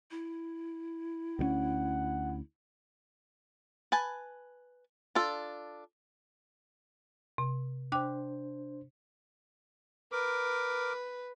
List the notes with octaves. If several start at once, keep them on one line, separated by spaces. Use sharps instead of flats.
E4
D2 G3 C#4 F#5
B4 G#5 A5
D4 F4 A4
C3
D4 C5 G5 D6 F#6
A#4 B4 D6